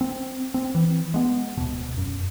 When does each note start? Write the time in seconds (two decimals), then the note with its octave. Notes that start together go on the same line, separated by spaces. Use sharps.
0.01 C4
0.54 C4
0.75 E3
1.14 G#3 B3
1.57 D1 B2
1.98 F#2